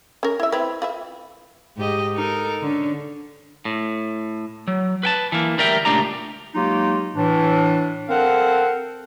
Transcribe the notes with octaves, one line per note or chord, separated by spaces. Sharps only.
C#4 A#4
E4 E5
C4 E4 B4
F4 B4 E5
G#2 G4 D#5
D#4 A4 A#4
D3 C#4
A2
F#3
B4 G5 A5
E3 A#3
D2 G3 A#4 E5 G5
C#2 A#2 A3 D4 G4 A#5
F#3 G#3 A#3 D#4 F4 G4
A2 E3 D4
C4 A4 A#4 F5 F#5